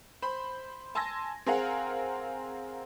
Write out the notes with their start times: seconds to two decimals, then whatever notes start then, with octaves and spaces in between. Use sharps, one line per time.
0.22 C5 B5
0.95 G#5 A5 C6 E6 G#6 A#6
1.46 C4 G#4 A#4 F5 F#5